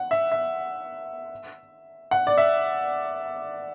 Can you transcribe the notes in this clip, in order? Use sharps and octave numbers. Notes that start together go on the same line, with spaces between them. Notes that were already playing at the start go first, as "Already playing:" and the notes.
Already playing: F#5
E5
E5
F#5
D5
E5